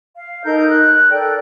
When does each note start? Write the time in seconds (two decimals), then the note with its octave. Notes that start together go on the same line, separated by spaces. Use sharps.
0.17 F5
0.43 D#4 A4 A#4 G6
0.67 F#6
1.09 A4 A#4 D5 G5